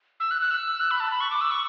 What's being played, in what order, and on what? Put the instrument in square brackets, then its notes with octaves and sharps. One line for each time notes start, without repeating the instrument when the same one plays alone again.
[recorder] E6
F#6
F#6
E6
F#6
B5
A5
B5
C#6
D6
E6
C#6